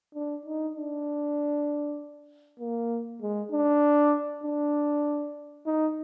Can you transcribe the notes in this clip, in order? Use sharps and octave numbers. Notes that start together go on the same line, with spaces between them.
D4
D#4
D4
A#3
G#3
D4
D4
D#4